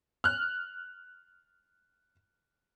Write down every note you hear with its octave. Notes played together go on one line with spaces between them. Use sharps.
F6 F#6